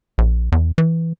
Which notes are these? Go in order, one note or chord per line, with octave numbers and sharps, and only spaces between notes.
A#1
E2
E3